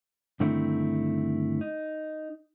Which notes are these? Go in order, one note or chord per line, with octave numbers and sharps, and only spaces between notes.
G2 D3 D#3 A3 C4 E4
D#4